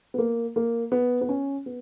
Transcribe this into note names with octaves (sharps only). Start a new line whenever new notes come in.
B3
A#3
A#3
B3
B3
C#4
B3